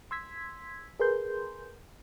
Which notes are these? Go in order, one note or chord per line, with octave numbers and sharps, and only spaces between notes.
C6 E6 G#6 B6
G#4 A#4 B4 C6 G6